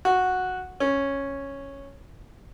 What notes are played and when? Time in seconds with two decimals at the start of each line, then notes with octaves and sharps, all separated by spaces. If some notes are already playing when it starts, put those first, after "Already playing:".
0.05 F#4
0.80 C#4